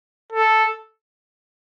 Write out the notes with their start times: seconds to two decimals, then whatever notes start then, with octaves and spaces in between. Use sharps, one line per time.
0.33 A4